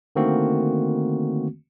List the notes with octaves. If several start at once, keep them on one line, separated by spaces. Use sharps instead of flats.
D3 D#3 A3 A#3 C4 F#4